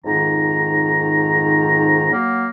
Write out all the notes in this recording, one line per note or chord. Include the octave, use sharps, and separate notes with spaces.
F2 G#2 D#3 D#4 A#5
F#3 A#3